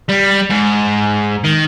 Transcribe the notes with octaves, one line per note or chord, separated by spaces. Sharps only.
G3
G#2
D#3